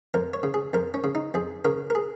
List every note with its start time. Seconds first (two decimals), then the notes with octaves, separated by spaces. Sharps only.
0.14 F2 A#4
0.34 C#5
0.43 C#3
0.54 G#4
0.73 F2 A#4
0.94 C#4
1.04 C#3
1.15 D#4
1.34 F2 G#4
1.65 C#3 A#4
1.90 A#4
1.95 G#4